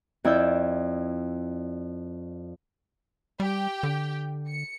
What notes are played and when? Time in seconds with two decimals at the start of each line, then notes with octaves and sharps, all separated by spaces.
0.24 F2 E4 D5 E6 G6
3.40 G3 G4 G5
3.83 D3
4.48 C#7